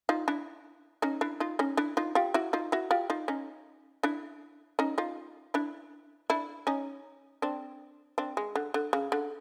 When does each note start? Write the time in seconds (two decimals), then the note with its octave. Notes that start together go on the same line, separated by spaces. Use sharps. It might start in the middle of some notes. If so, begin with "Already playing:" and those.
0.09 D#4 F4
0.28 D4 E4
1.02 C#4 D#4
1.21 D4 E4
1.40 D#4 F4
1.59 C#4 D#4
1.77 D4 E4
1.97 D#4 F4
2.15 F4 G4
2.34 E4 F#4
2.53 D#4 F4
2.72 E4 F#4
2.91 F4 G4
3.10 D#4 F4
3.28 C#4 D#4
4.03 D4 E4
4.79 C#4 D#4
4.98 D#4 F4
5.54 D4 E4
6.30 D4 E4
6.67 C#4 D#4
7.42 C4 D4
8.18 C4 D4
8.37 G#3
8.56 D3
8.74 D3
8.93 C#3
9.12 D3